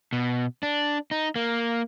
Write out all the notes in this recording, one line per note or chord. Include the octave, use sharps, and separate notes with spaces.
B2
D4
D#4
A#3